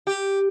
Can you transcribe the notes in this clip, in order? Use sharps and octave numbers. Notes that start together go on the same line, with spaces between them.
G4